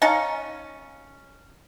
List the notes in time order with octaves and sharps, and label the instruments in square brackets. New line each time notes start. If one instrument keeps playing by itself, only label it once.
[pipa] C#4 D#4 F5 A5